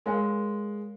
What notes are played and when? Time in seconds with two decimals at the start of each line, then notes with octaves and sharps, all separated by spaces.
0.06 G#3 A#4 C#5 F5 G#5